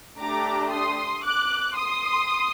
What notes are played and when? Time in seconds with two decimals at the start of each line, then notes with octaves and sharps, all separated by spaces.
0.19 A3 D4 G4 A#5 D6
0.71 C6 D#6
1.24 D6 F#6
1.76 C6 D#6